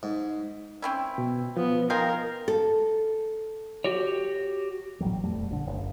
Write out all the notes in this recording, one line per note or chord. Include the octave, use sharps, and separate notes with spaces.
G#2
C4 C#4 E4
B2
F3 B3
D#4 G#4 A#4 F5 G5 C6
A4
F#4 G4 C#5
D#1 A1 F#3 G3
E1 F2 G3 A3
A#1 D3
F#1